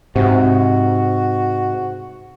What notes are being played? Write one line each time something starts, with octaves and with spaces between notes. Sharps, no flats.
G#2 C3 F#4